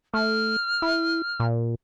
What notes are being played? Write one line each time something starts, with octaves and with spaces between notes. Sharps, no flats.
A3 F6
E4
A#2